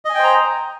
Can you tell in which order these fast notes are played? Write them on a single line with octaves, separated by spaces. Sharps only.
D#5 G#5 G5 C5 A#5